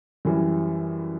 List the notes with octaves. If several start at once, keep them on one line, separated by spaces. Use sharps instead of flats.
F#2 E3 G3 E4